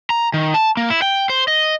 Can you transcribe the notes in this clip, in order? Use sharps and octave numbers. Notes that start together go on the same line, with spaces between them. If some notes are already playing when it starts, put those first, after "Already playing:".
A#5
D#3
A5
A#3
E4
G5
C5
D#5